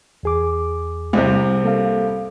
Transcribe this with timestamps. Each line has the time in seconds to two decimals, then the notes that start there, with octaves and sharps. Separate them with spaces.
0.23 E2 G#4 D6
1.13 C2 C3
1.64 A#3 A4 F5